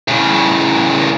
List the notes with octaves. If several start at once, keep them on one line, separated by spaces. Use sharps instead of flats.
A2 C#3